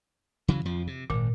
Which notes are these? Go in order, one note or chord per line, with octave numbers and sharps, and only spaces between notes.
C#3 E3 F#3
F2 F3
C3
G#1 A#2